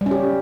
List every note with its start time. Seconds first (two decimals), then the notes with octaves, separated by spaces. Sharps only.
0.01 G3
0.06 C#4
0.11 G4